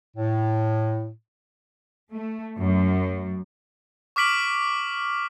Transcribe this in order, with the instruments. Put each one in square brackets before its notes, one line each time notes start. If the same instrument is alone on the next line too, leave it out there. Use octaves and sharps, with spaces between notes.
[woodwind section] A2
[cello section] A3
F#2
[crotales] C#6 D6 F6 B6 D7 F#7